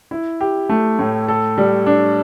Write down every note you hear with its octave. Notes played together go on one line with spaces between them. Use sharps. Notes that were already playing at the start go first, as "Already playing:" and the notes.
E4
G4
A3
A2
A4
G3
D4